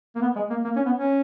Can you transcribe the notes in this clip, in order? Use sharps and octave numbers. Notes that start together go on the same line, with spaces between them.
A#3
B3
G#3
A#3
A#3
C#4
B3
C#4